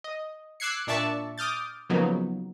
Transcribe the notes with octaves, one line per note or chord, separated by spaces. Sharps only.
D#5
D6 E6 F#6 G#6 C7 C#7
A#2 D4 D5 E5 A5 C#6
D6 D#6 F6 G6 A6
C#3 F3 F#3 A#3 B3 D#4